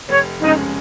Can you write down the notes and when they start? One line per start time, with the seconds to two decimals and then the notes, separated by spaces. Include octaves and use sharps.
0.09 F1 C#5
0.42 F2 C#3 G#3 C#4 D#4